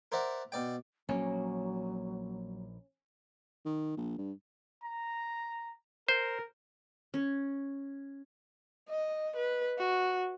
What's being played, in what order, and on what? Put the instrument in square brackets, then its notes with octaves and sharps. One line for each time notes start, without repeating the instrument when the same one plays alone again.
[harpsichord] A#4 C5 D5 E5 F#5
B2 D5 G5
[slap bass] A#1 A#3 [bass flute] F#3 [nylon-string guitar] C#4
[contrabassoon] D#3
A#1
G2
[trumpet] A#5
[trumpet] A#4 [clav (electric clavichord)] C5
[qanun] C#4
[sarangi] D#5
B4
F#4